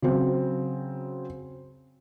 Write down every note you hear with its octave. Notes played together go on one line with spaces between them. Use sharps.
C#3 F#3 C4